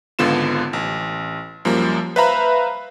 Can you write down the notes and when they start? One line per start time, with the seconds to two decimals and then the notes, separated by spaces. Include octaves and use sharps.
0.19 G#1 C#2 D3 B3 F4 E7
0.73 A1
1.65 F#2 F3 G3 A#3
2.16 B4 C5 E5 F5 A#5 B5